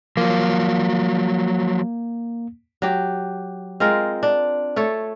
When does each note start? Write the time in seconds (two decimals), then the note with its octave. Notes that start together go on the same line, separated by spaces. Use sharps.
0.17 F3 F#3 A#3
2.82 F#3 G4
3.80 G#3 C4 F4 A#4
4.23 D4
4.76 A3 A4 C#5